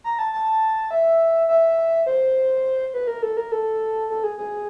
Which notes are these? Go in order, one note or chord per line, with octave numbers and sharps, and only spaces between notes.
A#5
A5
A5
E5
E5
C5
B4
A#4
A4
A#4
A4
A4
G#4
G#4